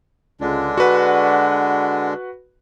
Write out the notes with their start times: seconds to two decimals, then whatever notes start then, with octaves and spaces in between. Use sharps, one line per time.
0.41 C#2 D3 G#3 D4
0.77 F#4 B4 F#5